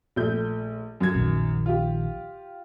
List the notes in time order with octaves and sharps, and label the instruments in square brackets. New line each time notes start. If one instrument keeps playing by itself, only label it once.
[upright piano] A#1 A3 G6
F#2 F#3 G#6
[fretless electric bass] A#1 D#3
[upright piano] F4 G4